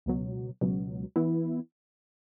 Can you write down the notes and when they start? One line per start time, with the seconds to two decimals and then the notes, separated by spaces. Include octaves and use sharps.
0.06 C#2 B2 F#3
0.61 C#2 B2 F#3
1.16 E3 B3 E4